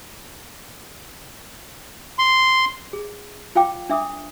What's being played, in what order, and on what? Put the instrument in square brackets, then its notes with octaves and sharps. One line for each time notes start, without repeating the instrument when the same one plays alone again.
[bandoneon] C6
[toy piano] G#4
F4 F5 G5 D6
D4 E5 D6 D#6